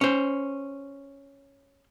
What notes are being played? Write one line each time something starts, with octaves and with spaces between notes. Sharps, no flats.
C#4 C5